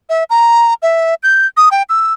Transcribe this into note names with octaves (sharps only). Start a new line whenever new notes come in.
E5
A#5
E5
G6
D#6
G5
E6